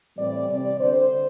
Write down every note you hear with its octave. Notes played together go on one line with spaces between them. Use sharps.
A2 E3 G3 C4 D5
C3 G3 C4 D5
D3 C4 C5